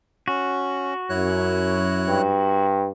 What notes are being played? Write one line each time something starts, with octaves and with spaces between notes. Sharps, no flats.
C#4 F#4
F#2 E4 C#5 F#6
G2